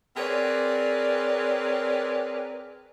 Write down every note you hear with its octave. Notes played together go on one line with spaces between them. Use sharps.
C4 G#4 A#4 B4 C#5 D5